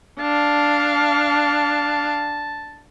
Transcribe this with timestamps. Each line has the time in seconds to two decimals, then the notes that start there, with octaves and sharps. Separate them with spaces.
0.20 D4 F5 A5